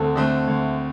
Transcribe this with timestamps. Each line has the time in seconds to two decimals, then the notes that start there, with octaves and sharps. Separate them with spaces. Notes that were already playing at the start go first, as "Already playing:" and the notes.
Already playing: D2 D3 A3 C4 A4
0.16 D3 A3 C4
0.48 D2